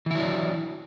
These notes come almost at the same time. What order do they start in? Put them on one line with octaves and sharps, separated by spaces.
E3 E4 F#3 D4